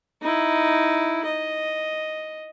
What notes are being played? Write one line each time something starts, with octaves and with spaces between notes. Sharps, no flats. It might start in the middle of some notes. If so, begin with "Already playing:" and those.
D#4 E4
D#5